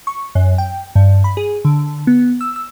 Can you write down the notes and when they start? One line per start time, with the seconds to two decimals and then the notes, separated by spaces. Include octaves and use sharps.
0.07 C#6
0.35 F#2
0.58 G5
0.96 G2
1.24 B5
1.37 G#4
1.65 D3
2.07 B3
2.41 E6
2.56 E6